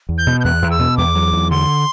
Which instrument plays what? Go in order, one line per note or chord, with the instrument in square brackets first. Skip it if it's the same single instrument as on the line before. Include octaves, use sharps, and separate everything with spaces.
[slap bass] E2
[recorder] G6
[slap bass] B2
[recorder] G6
[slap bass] E2 [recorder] F#6
[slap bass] E2
[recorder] E6
[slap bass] B2
[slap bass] E2 [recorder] D6
[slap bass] F#3
E2
[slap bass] D3 [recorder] C6